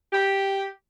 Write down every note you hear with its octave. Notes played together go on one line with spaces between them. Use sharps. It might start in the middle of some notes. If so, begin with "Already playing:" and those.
G4